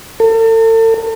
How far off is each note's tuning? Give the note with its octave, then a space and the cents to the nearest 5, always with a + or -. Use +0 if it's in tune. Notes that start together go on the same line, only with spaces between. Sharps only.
A4 +40